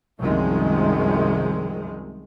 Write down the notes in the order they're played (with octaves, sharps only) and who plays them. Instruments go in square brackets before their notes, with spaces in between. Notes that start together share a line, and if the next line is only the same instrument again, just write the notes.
[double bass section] C2 F#2 C3 D#3 F3 G#3